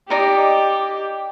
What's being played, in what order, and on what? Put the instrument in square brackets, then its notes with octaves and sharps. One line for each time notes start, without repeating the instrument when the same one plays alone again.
[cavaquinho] D#4 D5 D#5 [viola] G4